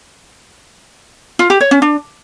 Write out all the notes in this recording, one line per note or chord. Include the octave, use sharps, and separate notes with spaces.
F4
G4
C#5
C#4
D4